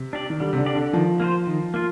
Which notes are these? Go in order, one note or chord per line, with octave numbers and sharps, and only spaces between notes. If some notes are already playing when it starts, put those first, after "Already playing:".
Already playing: C3
D4 G4 D5
D#3
D3 G3
C3
D3
D4 G4 D5
D3
D#3 F3
A#3 F4 C5
D#3
A#3 F4